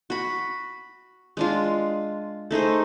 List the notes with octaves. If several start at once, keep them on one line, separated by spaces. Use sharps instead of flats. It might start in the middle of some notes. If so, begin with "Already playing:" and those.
F#4 B5
G#3 D4 F4
A3 D#4 G#4 C5